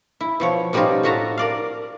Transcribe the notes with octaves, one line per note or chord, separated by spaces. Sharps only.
E4
B2 F3 C#5
B2 G3 C4 C#4 D#4 F4
A2 F4 F#4 E5 A5 A#5
A#4 D5 F5